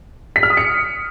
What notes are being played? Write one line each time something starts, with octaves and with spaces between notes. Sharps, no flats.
B6
F6
D#6
C#7